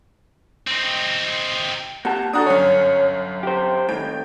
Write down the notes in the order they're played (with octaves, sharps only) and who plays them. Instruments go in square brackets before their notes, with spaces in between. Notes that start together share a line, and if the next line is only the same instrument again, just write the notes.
[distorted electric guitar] C4 D#4
[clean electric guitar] A#3 G4 A5 [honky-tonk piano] F#5
[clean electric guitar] D4 A4 [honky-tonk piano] F#4 A#5 D#6
[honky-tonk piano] G1 F#2 [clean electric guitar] C#5
[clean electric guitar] G4 C5
[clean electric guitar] A2 D#3 [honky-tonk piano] G5